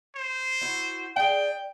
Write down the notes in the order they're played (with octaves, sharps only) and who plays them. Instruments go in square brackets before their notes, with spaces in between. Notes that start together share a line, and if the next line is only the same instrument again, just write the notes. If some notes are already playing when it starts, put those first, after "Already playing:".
[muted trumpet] C5
[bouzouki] E4 F#4
[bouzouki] D4 G#4 [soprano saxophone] G5